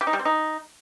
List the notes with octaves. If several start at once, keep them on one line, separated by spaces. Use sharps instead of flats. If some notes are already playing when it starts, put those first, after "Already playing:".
G4
D#4
G3
C4
D#4